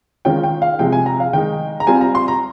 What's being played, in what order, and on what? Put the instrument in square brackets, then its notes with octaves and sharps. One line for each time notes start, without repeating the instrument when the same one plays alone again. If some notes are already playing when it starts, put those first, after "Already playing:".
[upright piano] D#3 G#3 C#4 F4 G5
G5
F5
C3 F3 G#3 G5
G#5
A#5
F5
D#3 G#3 D#4 G5
A#5
G3 C4 F4 G#5
A#5
C6
A#5